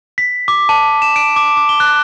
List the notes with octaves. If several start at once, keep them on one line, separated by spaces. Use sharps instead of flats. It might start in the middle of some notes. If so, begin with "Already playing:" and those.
B6
D6
A5
E7
D7
D6
D6
G7
F#6